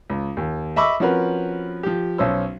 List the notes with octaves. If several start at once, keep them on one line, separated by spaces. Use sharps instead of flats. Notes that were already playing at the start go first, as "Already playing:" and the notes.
C#2
D#2
D#5 E5 B5 C#6 D6 E6
F3 C4 C#4 F#4 A#4 B4
F3 G4
B1 C#4 C5 E6